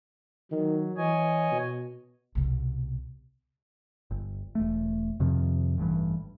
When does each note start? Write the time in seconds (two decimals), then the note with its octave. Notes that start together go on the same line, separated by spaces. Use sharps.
0.52 D#3 F#3
0.97 E3 C#5 D#5 G#5
1.51 B2
2.35 C2 B2
4.11 G1
4.55 E1 A3
5.20 F2 C3 D#3 F3
5.78 A1 G2 E3